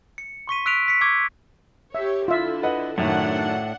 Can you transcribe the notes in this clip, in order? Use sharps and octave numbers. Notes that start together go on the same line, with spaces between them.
C#7
C6 C#6 B6 D#7
E6 F#6 B6 D7 D#7 F7
C#6 B6 C#7
C#6 D6 E6 G#6
G4 C#5 E5
D3 E4 F4 E5
B4 D#5 F#5
F#2 A2 D#3 A3 D4 F#5